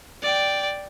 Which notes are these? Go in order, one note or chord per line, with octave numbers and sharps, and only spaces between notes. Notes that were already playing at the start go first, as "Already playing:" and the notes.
D5 G5